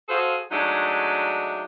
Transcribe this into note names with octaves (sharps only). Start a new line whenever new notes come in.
F#4 G#4 A4 C5 F5
F#3 G#3 A3 D4 D#4